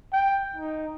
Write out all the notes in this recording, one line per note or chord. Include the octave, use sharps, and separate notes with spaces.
G5
D#4